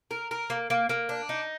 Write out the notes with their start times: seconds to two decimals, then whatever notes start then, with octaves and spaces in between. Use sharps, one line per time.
0.11 A#4
0.31 A#4
0.50 A#3
0.70 A#3
0.89 A#3
1.09 D4
1.29 D#4